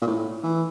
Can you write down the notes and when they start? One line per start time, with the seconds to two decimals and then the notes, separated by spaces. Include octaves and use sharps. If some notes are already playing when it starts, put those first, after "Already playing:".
0.02 A#2
0.07 A2
0.43 E3